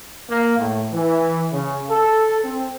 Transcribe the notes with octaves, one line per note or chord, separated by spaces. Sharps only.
A#3
A2
E3
C#3
A4
C4